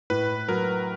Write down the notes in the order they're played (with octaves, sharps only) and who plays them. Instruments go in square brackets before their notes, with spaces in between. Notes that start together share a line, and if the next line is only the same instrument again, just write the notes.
[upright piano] A2 [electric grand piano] B4
[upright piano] F#3 [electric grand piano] A#4